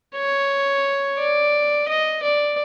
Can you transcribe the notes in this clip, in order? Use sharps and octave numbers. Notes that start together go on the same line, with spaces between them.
C#5
D5
D#5
D5